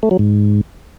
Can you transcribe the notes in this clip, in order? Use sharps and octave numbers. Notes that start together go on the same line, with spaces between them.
A3
F#3
G#2